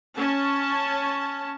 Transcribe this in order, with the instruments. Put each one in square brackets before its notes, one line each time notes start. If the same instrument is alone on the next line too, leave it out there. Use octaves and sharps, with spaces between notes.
[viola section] C#4 A5